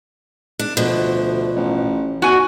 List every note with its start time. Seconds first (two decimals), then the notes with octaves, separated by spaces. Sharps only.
0.59 D4
0.77 D2 B2 F3
1.56 A1
2.22 B2 F#4 G#5